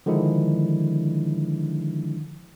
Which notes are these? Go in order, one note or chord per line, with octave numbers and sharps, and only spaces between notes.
D3 D#3 F3 G#3 D4 E4